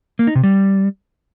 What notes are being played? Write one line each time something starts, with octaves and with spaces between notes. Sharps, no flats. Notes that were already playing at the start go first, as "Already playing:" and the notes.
A#3
D#4
C3
G3